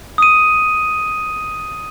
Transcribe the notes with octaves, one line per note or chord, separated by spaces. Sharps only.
D#6 D#7